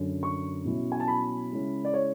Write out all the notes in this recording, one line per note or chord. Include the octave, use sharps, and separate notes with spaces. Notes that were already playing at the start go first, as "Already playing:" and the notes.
Already playing: F#2 D3 F#3 C#4
C#6
B2 F#3 C#4 E4
G#5
A5
B5
C#3 G#3 C#4 E4
D5
C#5